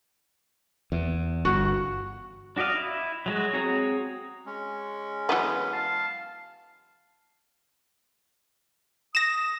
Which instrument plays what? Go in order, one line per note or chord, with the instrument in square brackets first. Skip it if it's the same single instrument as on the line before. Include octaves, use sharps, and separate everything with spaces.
[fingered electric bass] E2
[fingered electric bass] G1 [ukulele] F#4
[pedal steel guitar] D4 F#4 D5 D#5 F5
E4
F#3 G#3 F#4
C4 F#4 G#4 C#5 A#5
[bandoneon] G#3 C#4
[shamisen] E3 F#3 B3
[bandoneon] F5 A5
[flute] D#6 [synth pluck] A#6 E7